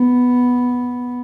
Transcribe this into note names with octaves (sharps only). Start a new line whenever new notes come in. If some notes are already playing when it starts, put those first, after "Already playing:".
Already playing: B3